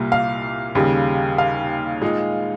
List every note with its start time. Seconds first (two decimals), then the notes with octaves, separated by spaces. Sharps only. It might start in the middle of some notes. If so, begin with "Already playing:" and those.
Already playing: C2 A#2 G3 A#3
0.12 F5
0.75 D#2 C#3 G3
1.38 F5
2.02 A#2 G#3 D#4